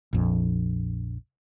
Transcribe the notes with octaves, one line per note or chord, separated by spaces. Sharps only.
A#1 F2